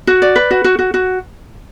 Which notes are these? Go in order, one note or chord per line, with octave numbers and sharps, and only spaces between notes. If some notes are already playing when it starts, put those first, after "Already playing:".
F#4
D5
B4
F#4
F#4
F#4
F#4